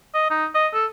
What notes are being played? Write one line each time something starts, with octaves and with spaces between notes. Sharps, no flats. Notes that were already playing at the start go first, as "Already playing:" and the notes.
D#5
D#4
D#5
A4